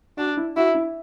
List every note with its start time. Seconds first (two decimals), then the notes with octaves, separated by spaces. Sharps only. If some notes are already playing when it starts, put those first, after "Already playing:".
0.17 D4 F#4
0.37 E4
0.56 E4 F#4
0.75 E4